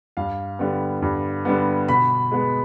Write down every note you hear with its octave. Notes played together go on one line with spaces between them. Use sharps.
G2 F5
D3 G3 B3
G2
D3 G3 B3
B2 B5
G#3 B3